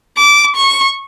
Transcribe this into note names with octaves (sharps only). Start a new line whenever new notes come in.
D6
C#6